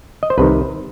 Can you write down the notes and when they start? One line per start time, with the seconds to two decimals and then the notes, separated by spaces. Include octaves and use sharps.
0.23 D#5
0.30 C5
0.38 C2 C3 D#3 B4